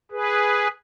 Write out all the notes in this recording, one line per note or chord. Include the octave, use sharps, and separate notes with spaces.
G#4 B4